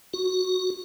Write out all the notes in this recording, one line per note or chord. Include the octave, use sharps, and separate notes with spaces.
F#4